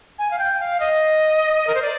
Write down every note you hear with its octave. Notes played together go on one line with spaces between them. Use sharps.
G#5
F5
G5
F5
D#5
A#4
C5
D5